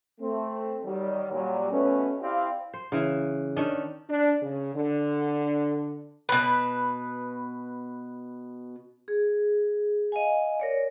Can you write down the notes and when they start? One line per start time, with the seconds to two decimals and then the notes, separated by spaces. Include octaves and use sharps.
0.21 A3 C4
0.84 D#3 F#3 G3
1.32 A#2 F#3 G3
1.71 B2 A3 C#4 B4
2.21 C4 E4 G4 D5 F5
2.74 C5
2.92 C#3 E3
3.56 D#3 C#4 D4
4.10 D4
4.43 C#3
4.75 D3
6.29 B2 B4
9.08 G#4
10.12 D#5 F5 G#5
10.60 A#4 C#5 D5